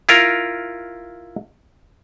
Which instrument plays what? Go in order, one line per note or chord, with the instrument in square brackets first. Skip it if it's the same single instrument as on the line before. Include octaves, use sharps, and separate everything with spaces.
[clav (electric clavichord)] E4 F4 A#4